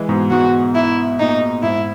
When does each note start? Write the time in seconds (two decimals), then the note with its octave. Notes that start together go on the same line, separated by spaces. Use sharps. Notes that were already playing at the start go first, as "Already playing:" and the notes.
Already playing: E3 G#3
0.09 G#2 B2
0.31 G#2 B2 F#4
0.75 E4
1.20 A#2 D#4
1.63 G#2 E4